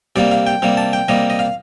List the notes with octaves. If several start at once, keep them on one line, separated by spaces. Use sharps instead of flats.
C3 G3 A#3 D5
F5
G5
C3 G3 A#3
A5
G5
C3 G3 A#3 D#5
D#5
F5